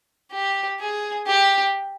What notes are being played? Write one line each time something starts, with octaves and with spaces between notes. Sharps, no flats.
G4
G#4
G4